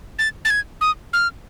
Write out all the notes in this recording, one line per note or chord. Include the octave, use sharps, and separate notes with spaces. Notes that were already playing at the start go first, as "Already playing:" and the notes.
A6
A6
G#6
D#6
F6